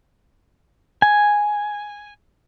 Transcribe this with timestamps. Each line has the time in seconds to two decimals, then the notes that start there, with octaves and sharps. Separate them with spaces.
1.02 G#5